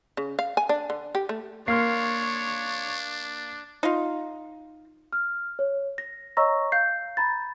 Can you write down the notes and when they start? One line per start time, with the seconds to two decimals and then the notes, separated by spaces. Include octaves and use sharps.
0.17 C#3
0.39 F5
0.57 G#5
0.69 D4
0.90 D3
1.15 G4
1.29 A3
1.68 A#3 D4 C#5 C6 F6 C7
3.83 D#4 F4
5.13 F6
5.59 C#5
5.98 A#6
6.37 C#5 D#5 A#5 C#6 E6 A#6
6.72 F5 G6 C7
7.17 A#5 B5 A6